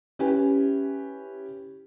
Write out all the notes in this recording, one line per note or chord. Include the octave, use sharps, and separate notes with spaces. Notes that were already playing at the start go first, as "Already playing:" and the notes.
C#4 E4 G4 B4 G#5